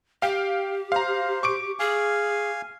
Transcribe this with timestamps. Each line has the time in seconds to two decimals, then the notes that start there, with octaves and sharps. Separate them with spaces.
0.22 G4 F5 G5
0.92 C5 F5 A#5
1.43 C#6 D6 D7
1.79 G#4 F5 G#5